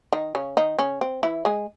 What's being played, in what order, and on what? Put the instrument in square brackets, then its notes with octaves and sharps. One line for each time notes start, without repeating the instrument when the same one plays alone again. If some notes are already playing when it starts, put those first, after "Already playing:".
[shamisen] D#3 D#4
C#3 C#4
D#3 D#4
C#3 C#4
C4
E3 E4
G#3 G#4